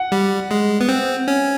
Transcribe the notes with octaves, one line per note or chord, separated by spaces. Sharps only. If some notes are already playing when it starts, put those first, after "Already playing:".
Already playing: F#5
G3
G#3
B3
C4
C#4